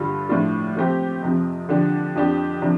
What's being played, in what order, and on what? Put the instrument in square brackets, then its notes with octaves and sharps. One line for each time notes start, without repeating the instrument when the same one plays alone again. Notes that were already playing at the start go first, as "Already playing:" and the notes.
Already playing: [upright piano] G2 D3 G3 F4
A2 F3 D4 F4
F3 A3 C4 G4
F2 C3 F3
D3 F3 D4 G4
F2 F3 D4 G4
C3 F3 D4